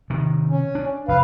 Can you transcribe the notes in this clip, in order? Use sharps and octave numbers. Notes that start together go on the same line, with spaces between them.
C3 D#3
C#4
D4
F1 B4 F5